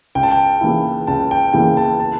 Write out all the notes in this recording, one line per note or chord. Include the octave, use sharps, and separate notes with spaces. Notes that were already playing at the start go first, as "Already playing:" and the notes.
C#2 G5
A5
G5
C#3 E3 A#3 E4
C#2 A5
G5
C#3 E3 A#3 E4 G5
A5
A5